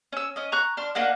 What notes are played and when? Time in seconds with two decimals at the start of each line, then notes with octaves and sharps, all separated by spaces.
0.12 C#4 E6
0.36 C#4 D#5
0.52 A#5 C#6 F#6
0.77 D4 C6 F6
0.95 A#3 D4 D#4 F#5